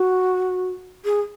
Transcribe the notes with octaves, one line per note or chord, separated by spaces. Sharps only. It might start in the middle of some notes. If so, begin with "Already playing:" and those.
Already playing: F#4
G#4